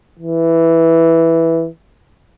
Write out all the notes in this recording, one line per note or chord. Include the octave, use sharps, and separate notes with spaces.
E3